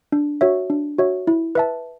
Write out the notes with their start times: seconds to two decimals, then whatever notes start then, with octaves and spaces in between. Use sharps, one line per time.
0.12 D4
0.41 F#4 C#5 E5
0.70 D4
0.98 F#4 C#5 E5
1.27 E4
1.55 B4 E5 A5